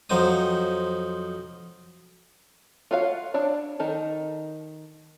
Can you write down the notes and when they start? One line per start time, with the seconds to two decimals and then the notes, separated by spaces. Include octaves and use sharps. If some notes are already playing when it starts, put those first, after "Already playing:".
0.10 F2 F#3 D#4 C5 D#6
2.91 F4 F#4 C#5 F5
3.34 D4 C#5 D5
3.79 D#3 D#4 A4